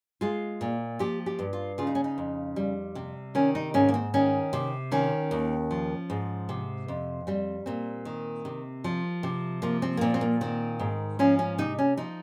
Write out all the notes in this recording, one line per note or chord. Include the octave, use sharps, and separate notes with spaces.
G#3 F4
A#2
F3 G4
G4
G2
F4
C#3 F4
D#4
C#4
D#4
F2
G3
C3
D#3 C#4
D#4
G#2 C#4
A#3
C4
D#3 C#4
C3
D#3 C#4
D#2
F3
G#2
C3
F2
G3 C4
A#2 C4
D#3
C3
F3
C3
F3 A#3
C4
A#3
A#2 C4
C4
A#3
D#3 C4
G#2
F3 C#4
C#4
C3 D#4
C#4
F3 D#4